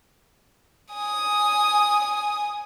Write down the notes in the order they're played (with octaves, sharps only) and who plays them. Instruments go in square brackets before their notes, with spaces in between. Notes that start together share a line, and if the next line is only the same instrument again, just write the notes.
[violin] G#5 D#6